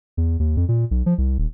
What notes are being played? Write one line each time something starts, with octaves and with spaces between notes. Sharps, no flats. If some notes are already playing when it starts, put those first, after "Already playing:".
E2
D#2
F2
A#2
B1
F3
C2
D#1